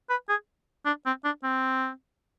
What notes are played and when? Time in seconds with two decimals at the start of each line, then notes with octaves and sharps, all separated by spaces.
0.10 B4
0.29 G#4
0.85 D4
1.06 C4
1.24 D4
1.43 C4